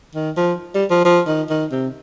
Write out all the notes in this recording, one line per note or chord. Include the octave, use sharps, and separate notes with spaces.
D#3
F3
G3
F3
F3
D#3
D#3
C3